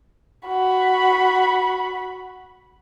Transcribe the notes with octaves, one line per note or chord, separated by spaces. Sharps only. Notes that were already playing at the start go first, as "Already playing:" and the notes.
F#4 B5